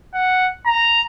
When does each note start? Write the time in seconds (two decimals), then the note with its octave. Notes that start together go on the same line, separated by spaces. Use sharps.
0.14 F#5
0.66 A#5